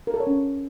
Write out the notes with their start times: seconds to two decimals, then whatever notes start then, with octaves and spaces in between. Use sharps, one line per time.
0.07 A#4
0.14 A4
0.20 C#5
0.27 C#4